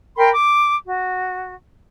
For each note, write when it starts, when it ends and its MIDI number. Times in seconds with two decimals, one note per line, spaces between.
0.17 0.31 70
0.17 0.31 79
0.17 0.31 83
0.17 0.31 84
0.33 0.74 86
0.86 1.54 66